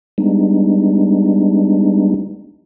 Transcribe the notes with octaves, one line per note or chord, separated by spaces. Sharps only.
G3 G#3 B3 D4 D#4